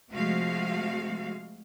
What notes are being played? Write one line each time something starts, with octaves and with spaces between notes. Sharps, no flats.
C3 F3 G#3 A3 F#4 F5